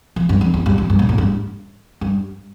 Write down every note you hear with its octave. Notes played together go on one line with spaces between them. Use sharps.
F3
G2
F2
E2
G2
F2
G2
A#2
A2
G2
G2